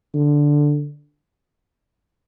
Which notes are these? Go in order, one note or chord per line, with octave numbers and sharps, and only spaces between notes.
D3